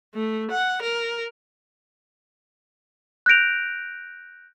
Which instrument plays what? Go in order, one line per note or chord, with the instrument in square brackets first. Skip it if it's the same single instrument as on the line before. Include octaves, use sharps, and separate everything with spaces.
[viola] A3
F#5
A#4
[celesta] F#6 G6 A#6 D7 F7